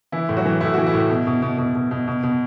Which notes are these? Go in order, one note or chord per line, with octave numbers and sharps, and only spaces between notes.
E3 E4
A2
F#3 F#4
E3
A2 E4
E3 F#4
E4
A2
B2
B2
B2
B2
B2
B2
B2
B2